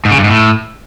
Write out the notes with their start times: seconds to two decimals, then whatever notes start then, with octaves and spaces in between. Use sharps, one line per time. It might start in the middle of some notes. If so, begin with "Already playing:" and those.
0.05 G#2
0.11 C#3
0.17 G2
0.24 G#2
0.30 A2